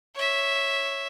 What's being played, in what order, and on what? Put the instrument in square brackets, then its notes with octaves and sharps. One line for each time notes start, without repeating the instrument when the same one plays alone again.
[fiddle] C#5 E5